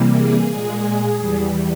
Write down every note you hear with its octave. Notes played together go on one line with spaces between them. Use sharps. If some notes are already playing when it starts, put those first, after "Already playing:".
Already playing: C3 E3 G3 A#3
G#4
A#2 G#3
E2 E3 G3